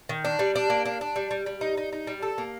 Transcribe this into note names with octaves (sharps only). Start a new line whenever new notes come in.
D#3
D4
G3
D4
A#3
D4
D4
G3
G3
G3
D#4
D#4
D#4
G3
A4
A#3